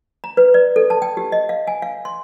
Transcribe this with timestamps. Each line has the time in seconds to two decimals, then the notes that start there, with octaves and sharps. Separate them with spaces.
0.24 A#5
0.37 B4
0.54 D5
0.76 A4
0.90 A5
1.02 G5
1.17 G4
1.32 D#5
1.49 F5
1.67 G#5
1.82 F5
2.05 C6